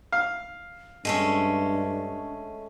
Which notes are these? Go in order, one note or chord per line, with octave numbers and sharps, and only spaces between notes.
F5
G2 G#3 A3 C#4 D4